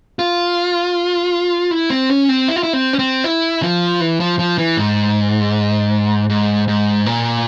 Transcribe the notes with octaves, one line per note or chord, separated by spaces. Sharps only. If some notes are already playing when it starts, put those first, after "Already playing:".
F4
E4
C4
C#4
C4
E4
F4
E4
C4
C#4
C4
E4
F3
E3
F3
F3
E3
G#2
G#2
G#2
A#2